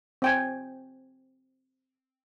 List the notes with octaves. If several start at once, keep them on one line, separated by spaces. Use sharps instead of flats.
C4 G5 G#5